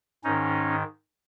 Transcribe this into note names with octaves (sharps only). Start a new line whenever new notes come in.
G#2 D#3 C#4 D#4